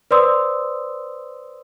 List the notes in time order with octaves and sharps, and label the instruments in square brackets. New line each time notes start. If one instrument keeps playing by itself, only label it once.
[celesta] B4 C5 D5 C6 D#6 E6